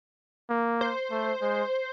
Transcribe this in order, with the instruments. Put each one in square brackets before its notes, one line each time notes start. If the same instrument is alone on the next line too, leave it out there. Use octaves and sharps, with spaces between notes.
[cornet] A#3
[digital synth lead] C5
[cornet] A3
G#3